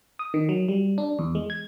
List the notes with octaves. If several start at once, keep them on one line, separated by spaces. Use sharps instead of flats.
D#6
D#3
F#3
G3
D4
E2
G#3
G#6